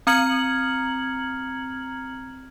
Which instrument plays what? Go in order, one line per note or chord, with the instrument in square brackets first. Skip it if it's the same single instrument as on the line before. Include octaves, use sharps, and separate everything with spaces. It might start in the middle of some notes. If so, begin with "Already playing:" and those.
[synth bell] C4 A#5 F6 G#6 C#7 F#7